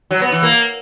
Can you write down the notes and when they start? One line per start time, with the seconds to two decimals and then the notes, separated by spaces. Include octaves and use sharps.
0.11 F#3
0.21 B3
0.32 E3
0.43 A#3